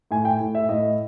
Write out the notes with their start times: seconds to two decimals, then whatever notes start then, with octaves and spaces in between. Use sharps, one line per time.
0.11 A2 G#5
0.25 G5
0.40 A2
0.55 E5
0.69 A2 D#5